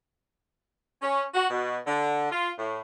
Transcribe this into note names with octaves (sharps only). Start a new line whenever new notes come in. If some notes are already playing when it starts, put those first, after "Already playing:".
C#4
F#4
B2
D3
F4
A2